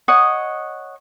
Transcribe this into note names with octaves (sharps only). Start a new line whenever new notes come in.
C#5 D#5 F#5 D#6